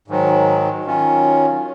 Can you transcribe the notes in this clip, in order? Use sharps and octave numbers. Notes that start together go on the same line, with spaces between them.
G#2 D#3 F#3
D#3 F#3 C#4 F4